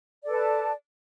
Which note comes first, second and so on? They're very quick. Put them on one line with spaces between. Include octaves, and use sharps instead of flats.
D5 A4 B4 A5